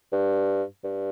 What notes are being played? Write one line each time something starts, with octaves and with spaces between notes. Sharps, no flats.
G2
G2